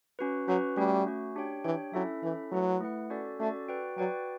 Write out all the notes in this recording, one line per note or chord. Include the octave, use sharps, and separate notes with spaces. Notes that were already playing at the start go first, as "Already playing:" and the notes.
C#4 F#4 B4
F#3 C#4 F#4 B4
G3 A3 C#4 F#4
A3 C#4 F#4
D4 G4 C#5 G5
E3 D4 G4 C#5 G5
F#3 C#4 E4 A4 E5
E3 C#4 E4 A4 E5
F#3 A3 E4 B4 F#5
A3 E4 B4 F#5
C#4 F#4 A4 D5
A3 C#4 F#4 A4 D5
F#4 B4 D5 G5
F#3 F#4 B4 D5 G5